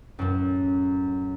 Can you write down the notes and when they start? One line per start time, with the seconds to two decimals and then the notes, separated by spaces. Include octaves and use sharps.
0.19 F#2 A2 F#3